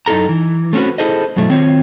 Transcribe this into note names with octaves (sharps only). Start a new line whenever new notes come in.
F#2 D#4 E4 A4 A#5
E3
A3 C4 C#4 F#4 B4
E4 G#4 A4 C5 D#5
F#2 B2 F#3 A3 E4
D#3 C4 F4 C#5